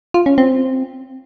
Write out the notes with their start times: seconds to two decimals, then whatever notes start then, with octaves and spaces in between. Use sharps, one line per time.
0.14 F4
0.26 C#4
0.38 C4